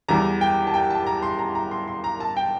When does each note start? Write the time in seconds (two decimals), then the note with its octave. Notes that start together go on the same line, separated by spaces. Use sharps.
0.08 E2 E3 G3 A#5
0.41 G5
0.67 A5
0.74 G5
0.90 A5
1.07 A#5
1.22 C6
1.39 A#5
1.55 A#5
1.71 C6
1.88 C6
2.04 A#5
2.20 A5
2.37 G5